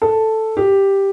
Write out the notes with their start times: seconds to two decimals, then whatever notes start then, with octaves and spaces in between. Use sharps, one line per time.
0.02 A4
0.57 G4